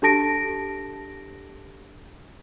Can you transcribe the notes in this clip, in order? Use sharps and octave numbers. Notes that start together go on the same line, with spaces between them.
D4 G4 A4 A5 A#6 D7